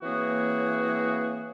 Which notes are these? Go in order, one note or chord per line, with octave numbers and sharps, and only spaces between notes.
E3 A#3 C4 F#4 G#4 C#5